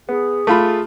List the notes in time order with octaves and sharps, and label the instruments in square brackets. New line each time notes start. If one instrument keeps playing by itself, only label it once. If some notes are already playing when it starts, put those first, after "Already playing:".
[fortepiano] B3 [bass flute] G#4
[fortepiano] A3 F4 B5